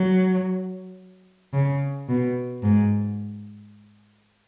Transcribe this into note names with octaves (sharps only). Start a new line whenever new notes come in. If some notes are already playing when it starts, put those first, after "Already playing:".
Already playing: F#3
C#3
B2
G#2